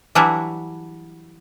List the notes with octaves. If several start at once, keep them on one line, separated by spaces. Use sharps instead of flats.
E3 F#3 G3 D4 E4 F#4